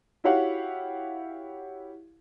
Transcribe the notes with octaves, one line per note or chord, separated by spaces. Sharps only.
E4 F#4 G4 C#5 F5 F#5